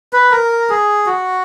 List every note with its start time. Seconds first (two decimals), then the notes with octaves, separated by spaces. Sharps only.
0.13 B4
0.31 A#4
0.70 G#4
1.06 F#4